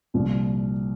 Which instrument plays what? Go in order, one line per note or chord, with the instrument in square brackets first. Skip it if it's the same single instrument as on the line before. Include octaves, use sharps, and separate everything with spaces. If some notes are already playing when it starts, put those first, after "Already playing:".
[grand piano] C2 A#2 F3